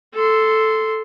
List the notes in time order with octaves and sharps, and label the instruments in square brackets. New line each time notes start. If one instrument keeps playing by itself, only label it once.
[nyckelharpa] A4 C6